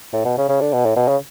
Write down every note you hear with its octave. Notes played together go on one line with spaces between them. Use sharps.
A2
B2
C#3
C#3
D3
B2
A2
B2
C#3